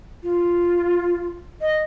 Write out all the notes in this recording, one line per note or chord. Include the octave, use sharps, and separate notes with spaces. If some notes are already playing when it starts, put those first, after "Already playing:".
F4
D#5